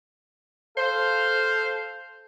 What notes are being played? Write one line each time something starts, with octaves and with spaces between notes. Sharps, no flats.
A4 C5 F5